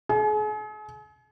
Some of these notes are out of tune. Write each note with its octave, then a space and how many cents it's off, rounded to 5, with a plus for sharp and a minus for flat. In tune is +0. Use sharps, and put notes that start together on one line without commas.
G#4 +40